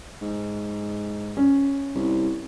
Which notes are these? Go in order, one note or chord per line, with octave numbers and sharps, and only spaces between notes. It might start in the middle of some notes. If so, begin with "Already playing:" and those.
G#2
C#4
C2